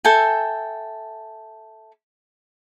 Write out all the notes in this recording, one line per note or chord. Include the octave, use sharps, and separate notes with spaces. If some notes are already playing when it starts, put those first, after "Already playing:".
A4 E5 G5 G#5